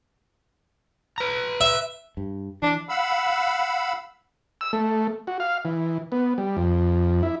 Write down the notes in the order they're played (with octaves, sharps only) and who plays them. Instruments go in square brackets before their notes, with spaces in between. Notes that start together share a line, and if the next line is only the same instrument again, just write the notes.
[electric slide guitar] B4 A#5
[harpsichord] E5
[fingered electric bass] G2
[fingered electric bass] E3 [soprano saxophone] D4
[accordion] F5 F#5 B5 E6
[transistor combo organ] E6
A3
F#4
F5
E3
B3
G3
F2
E4